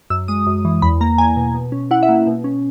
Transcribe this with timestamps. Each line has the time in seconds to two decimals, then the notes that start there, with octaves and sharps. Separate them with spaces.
0.10 F#2 E6
0.28 G#3 D#6
0.47 F#2
0.65 E3
0.82 E2 B5
1.01 A#3 A#5
1.18 E2 G#5
1.37 B2
1.54 B2
1.72 C#4
1.91 E4 F#5
2.03 E5
2.09 A#3
2.27 B2
2.44 C#4